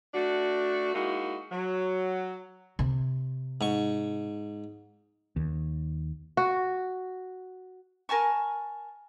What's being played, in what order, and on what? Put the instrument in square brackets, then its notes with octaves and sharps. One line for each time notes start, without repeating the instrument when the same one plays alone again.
[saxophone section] A3 D4 F#4
G#3 A#3 D#4 E4 F#4
F#3
[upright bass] C3
[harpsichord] G#2 C#6
[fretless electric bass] D#2
[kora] F#4
[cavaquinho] A#4 G#5 A5 C#6